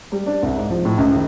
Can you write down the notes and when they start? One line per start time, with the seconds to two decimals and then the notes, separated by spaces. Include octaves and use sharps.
0.12 G3
0.26 D4
0.43 C2
0.56 G#2
0.70 F3
0.85 A2
0.98 C#2
1.14 D#3